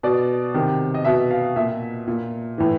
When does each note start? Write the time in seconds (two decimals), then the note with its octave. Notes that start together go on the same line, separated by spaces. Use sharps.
0.03 B2 D5
0.54 C3 D#3
0.94 D#5
1.05 B2 E5
1.31 F5
1.56 A#2 E5
2.08 A#2
2.58 A2 E3